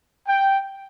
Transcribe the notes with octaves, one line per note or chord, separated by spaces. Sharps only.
G5